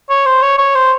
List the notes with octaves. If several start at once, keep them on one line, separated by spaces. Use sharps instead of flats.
C#5
C5
C#5
C#5
C5